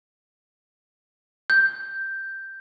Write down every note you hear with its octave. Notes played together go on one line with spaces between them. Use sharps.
G6